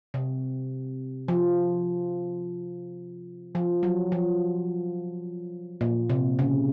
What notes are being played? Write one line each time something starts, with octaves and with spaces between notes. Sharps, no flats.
C3
F3
F3
F#3
F3
A#2
C3
C#3